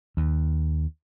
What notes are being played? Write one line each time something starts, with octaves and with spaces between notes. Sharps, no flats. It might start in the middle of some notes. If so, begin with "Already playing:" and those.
D#2